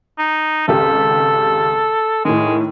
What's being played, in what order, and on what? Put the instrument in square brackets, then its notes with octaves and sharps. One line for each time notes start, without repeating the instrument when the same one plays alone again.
[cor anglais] D#4
[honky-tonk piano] G#1 C#2 G4 [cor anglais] A4
[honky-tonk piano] A2 D#3 [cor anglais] G#3